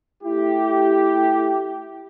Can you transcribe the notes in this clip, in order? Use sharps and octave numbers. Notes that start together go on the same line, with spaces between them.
A3 E4 G4